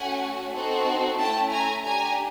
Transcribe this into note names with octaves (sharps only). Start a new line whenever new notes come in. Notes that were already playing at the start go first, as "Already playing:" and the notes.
Already playing: A3 C#4 F#4 F#5 G#5
C4 D#4 F#4 A4
A3 C#4 E4 G5 A5
G#5 A#5
D4 G4 G#5 A#5